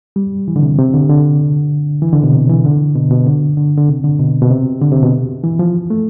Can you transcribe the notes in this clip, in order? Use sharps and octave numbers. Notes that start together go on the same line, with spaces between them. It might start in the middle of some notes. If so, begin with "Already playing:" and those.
G3
E3
D3
C3
C3
D3
D3
E3
D3
B2
C3
E3
D3
B2
B2
D3
D3
D3
C3
D3
B2
B2
C3
D3
C3
B2
E3
F3
A3